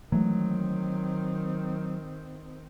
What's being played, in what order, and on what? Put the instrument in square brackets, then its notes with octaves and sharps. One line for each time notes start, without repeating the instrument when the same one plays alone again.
[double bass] D#3 C4 [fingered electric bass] E3 G#3 A3 [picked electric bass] F#3